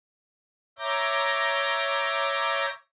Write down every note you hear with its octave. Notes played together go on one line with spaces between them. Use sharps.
C#5 E5 A#5 D6 G6 A#6